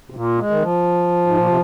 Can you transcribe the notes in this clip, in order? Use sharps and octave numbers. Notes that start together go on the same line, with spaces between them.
C3
A#2
G#3
D#3
F3
G#2
A#2
C3